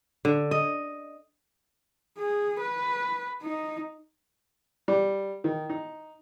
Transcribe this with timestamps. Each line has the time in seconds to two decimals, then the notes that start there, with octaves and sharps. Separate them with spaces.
0.25 D3
0.51 D#5
2.19 G#4
2.61 B4
3.43 D#4
4.88 G3
5.44 D#3
5.70 D#4